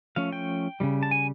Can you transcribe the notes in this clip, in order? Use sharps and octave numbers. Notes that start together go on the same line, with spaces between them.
F3 A3 C#4 F5
G5
C#3 E3 G3
A5
G#5